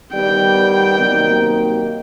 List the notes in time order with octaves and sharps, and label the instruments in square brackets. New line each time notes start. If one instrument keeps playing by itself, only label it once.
[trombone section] D#3 G3 B3 [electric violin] G5
[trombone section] C3 D#3 F#3 A#3 D#4